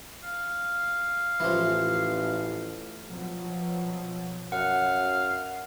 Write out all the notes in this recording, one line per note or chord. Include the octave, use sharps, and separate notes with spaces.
F5
A1 E3 F3
B2 F3 F#3
F#2 F5 F#5